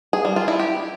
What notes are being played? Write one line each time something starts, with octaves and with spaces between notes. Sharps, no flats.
G#4
G3
F4
E4
G4